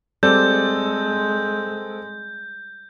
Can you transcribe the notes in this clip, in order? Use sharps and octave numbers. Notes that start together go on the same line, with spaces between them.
G3 G#3 C4 A4 D5 G6